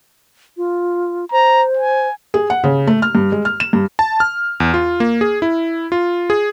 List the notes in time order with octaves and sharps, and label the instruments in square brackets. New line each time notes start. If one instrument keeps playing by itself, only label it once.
[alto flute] F4
[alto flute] C5 [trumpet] A#5
[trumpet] G#5
[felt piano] G#4
F#5
C#3
A3
F6
G2
G#3
F6
E7
G2
[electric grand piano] A5
F6
E2
F4
A#3
G#4
E4
F4
G#4